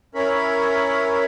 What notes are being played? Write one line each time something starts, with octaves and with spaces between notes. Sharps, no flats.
C#4 E4 A#4 C#5 B5